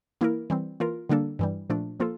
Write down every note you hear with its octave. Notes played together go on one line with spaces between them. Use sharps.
E3 A#3 E4 A#4
E3 G3 C4
E3 A#3 F4 A#4
D3 G3 A#3 D4 A4
G2 E3 G3
A#2 F3 A3 D4
F3 A#3 F4 A4